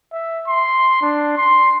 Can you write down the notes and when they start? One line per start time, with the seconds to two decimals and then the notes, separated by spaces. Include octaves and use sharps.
0.13 E5
0.48 C6
1.02 D4
1.38 C6